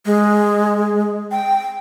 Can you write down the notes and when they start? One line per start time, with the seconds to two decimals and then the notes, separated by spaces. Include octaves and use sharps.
0.06 G#3
1.31 G5